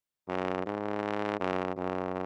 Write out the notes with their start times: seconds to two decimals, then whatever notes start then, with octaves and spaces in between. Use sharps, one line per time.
0.29 F#2
0.66 G#2
1.40 F#2
1.77 F#2